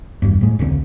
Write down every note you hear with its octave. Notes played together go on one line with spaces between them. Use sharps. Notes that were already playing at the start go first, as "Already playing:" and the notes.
G#1 E2 G2
A2 G#3
E1 C#2 D3 C4